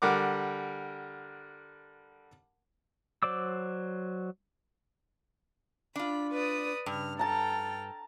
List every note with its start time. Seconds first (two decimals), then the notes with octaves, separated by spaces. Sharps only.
0.02 D3 G3 A#4 F#5 D6
3.23 F#3 C5 D5 D6 E6
5.96 D4 F4 B5
6.32 B4 D5 D#6
6.86 G2 C#3 F6
7.19 A4 G5 A5 A#5 F6